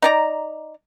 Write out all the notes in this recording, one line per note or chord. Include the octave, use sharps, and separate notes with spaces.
D#4 D5 A#5